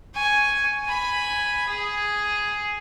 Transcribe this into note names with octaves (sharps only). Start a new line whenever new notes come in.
G#5 C#6
G#5 B5
G#4